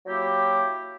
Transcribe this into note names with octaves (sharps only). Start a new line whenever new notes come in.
F#3 A#3 E4 G4